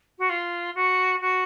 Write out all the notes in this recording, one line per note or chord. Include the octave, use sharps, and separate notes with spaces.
F#4
F4
F#4
F#4